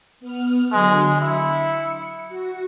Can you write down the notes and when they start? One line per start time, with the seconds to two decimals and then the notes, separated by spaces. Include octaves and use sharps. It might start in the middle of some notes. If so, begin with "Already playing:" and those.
0.21 B3 F6
0.73 D3 F#3 G#3
1.21 E4 C#7
2.29 F#4